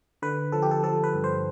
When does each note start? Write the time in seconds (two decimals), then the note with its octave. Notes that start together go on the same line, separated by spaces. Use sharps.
0.22 D3 B4
0.52 F3 A4
0.62 G4
0.71 A4
0.83 F3 A4
1.04 B4
1.15 G2
1.24 C5